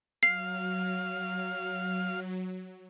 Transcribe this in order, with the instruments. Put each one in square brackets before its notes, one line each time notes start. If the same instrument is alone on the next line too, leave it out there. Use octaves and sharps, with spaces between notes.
[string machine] F#3 [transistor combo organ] F5 [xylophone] C7